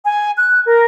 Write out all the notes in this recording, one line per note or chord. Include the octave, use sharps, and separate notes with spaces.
G#5
F#6
A#4